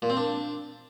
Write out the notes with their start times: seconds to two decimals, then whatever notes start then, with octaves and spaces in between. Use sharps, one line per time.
0.02 A#2
0.10 C4
0.17 D4